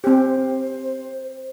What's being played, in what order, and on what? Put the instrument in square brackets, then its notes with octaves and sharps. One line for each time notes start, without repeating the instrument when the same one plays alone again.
[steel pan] C4 G4 [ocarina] C5